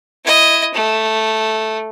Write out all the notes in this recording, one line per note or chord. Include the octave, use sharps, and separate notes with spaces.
E4 D#5
A3